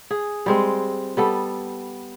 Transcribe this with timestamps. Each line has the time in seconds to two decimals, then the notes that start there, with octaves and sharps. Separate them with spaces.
0.11 G#4
0.46 G3 G#3 C4
1.17 G3 B3 A4